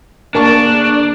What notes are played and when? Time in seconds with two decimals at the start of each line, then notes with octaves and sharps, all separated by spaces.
0.35 D2 A#3 D4 G#4 A#4 A5 C#6